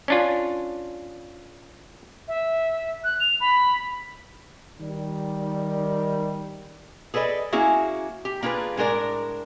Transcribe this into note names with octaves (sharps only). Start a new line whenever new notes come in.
C#4 D4 F4
E5
F#6
F7
B5
D#3 G3
G#4 A4 B4 D5 D#5
A#3 C#4 E4 F#4 G#4
G4
A#3 D4 F4 G#4 B4
A2 G#3 D4 A#4 D5